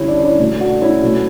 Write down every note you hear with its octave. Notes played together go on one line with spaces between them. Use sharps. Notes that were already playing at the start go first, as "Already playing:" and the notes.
Already playing: D3 G3 C#4 E4
D4
C#4 E4
B2 A3
D4 F#4
C#4 E4
B2 F#3 A3